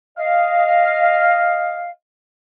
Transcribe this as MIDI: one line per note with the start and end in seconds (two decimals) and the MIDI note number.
0.18 1.90 75
0.18 1.90 77